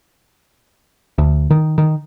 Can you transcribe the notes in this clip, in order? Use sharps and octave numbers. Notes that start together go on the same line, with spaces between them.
D2
D#3
D#3